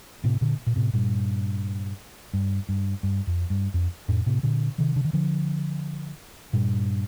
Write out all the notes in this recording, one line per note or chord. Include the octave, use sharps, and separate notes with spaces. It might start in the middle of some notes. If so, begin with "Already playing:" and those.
A2 C3
A#2 D3
A#2
A2 C3
G2 A#2
G2
G2
G2
F2
G2
F2
F2 A2
A2 C3
A#2 D3
C3 D#3
D3
D#3
D3 F3
G2 A#2